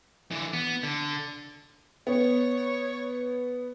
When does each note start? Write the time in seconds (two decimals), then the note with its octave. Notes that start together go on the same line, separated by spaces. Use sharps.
0.31 D3 E3
0.53 B3
0.83 D3
2.07 B3 C#5